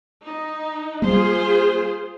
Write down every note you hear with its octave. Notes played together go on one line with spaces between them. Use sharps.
D#4
G3 A#3 F4 G#4 C5